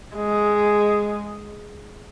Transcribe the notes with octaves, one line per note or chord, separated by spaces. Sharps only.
G#3